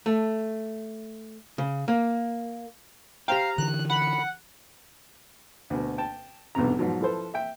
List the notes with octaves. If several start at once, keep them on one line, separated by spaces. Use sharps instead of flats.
A3
C#3
A#3
G4 C5 F5 G5 A#5
D3 E3 F#6
F#5 B5
D2 B2
G5 A5
B1 E2 G2 C3 A#5
G#2 B2 F3 F#3
F3 E4 A4 B4 C5
E5 G5